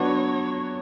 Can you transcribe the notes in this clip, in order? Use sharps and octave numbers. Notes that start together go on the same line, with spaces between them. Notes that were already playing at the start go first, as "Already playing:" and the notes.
Already playing: F#3 B3 D4 F#4 C#5